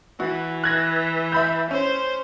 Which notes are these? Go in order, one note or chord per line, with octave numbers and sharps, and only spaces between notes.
E3 F#4
F#6 G#6 A#6
E5 B5 G6
C#4 C5